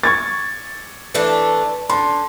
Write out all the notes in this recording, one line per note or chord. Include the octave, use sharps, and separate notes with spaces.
C#6 G#6 A6
E3 A3 D4
D3 C6